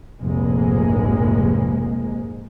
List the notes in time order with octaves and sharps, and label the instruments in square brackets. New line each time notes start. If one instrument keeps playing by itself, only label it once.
[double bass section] F1 A#1 G#2 G#3 A#3